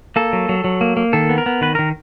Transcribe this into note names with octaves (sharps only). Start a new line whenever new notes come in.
A#3 A4
F#3
F#3
F#3
A#3
A#3
D#3 A4
B3
A#4
B3
D#3 B4
D#3 A#4